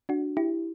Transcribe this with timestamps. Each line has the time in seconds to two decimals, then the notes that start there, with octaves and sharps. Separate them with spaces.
0.09 D4 F#4
0.37 E4 G4